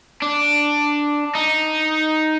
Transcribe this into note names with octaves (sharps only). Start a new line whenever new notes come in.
D4
D#4